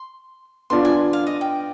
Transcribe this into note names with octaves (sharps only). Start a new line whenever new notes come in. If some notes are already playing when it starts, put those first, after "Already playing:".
Already playing: C6
B3 D4 F4 C6
G#5
F5
D#5
G5